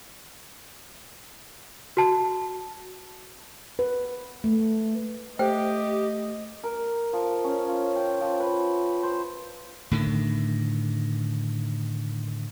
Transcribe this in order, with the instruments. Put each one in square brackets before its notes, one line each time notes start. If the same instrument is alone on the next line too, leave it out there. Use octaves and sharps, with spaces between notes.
[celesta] F#4 A5
[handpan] B4
A3
[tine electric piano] A3 [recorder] G4 [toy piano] C5 G5 [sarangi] D#5
[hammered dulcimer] A#4
F3
C#4
F4
G5
F3
B4
C5
[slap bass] A2 D3 D#3